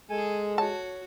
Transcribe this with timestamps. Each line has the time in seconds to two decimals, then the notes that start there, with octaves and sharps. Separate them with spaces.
0.10 G#3 G#4 A4 G#5
0.58 F#4 C#5 A5